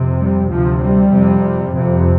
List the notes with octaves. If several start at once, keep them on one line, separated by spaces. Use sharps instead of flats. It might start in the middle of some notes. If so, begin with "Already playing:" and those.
Already playing: F2 C3
G3
D2 C3 F3
G3
F2 C3
F2 C3